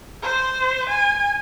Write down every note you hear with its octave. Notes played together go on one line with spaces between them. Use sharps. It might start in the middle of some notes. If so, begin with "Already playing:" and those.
C5
G#5